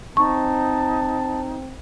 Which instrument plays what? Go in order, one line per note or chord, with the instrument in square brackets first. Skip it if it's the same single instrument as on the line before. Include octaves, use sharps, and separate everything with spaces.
[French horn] C4 [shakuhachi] D#4 [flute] A5 [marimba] C#6